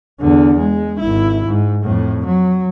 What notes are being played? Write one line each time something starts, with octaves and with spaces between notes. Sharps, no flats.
E2 D3
G#3
G#1 E4
G#2
F2 A2
F#3